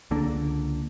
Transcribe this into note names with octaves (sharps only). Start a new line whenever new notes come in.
C#2 D3 A#3 D4